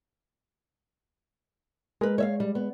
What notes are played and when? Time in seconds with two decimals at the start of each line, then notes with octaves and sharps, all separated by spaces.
2.01 G#3 A#4 B4
2.18 C#5 E5 F5
2.40 G3
2.55 B3